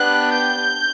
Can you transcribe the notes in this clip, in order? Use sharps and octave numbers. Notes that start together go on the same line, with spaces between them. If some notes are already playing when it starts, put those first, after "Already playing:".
Already playing: B3 D4 G4 F#6
G6